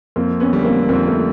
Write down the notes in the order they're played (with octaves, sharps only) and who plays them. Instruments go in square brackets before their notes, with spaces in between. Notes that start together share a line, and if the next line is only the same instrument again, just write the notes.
[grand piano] F2 [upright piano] A#3 C4
[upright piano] B3 C#4
[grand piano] D3 G3
[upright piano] A#3 C4
[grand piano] F2 [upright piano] A#3 C4
[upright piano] A3 B3